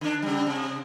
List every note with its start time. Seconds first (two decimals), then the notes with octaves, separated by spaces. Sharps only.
0.01 D3 D4
0.22 C#3 G3
0.47 C3